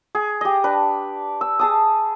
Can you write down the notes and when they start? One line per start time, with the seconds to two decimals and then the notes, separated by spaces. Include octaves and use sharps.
0.15 G#4
0.41 G4 D#5
0.64 D4 B4
1.41 E6
1.59 G#4 A5 D#6